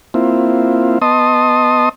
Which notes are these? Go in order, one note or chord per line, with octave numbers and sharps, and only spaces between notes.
A#3 C4 E4 F4
B3 D#5 A5 C6 D#6